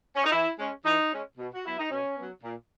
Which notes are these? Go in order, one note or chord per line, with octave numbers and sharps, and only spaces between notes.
C#4
D#4
E3 E4
G#3 C#4
E3 D#4
G#3 C#4
B2
F#4
F#3 B3 E4
D#4
B2 C#4
F#3 B3
A#2